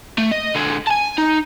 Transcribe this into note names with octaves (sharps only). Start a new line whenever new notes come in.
A3
D#5
D3 G#3
G#5 A5
D#4